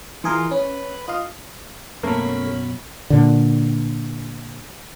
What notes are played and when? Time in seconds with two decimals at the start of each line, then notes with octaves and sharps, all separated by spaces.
0.24 E3 F4 G#4 A#4
0.51 C#4 B4
1.08 F4 D#5 F5
2.03 F#2 B2 A3 A#3 C#4 B5
3.10 A#2 D3